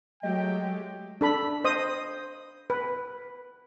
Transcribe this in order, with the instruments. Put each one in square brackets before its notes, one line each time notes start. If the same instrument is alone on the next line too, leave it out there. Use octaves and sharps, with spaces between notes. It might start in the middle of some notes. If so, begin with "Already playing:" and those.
[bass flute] F#3 [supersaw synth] G#3 A3 G4 [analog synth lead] D#5 [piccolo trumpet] G5
[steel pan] D4 A4 B5
C5 D#5 D#6
B4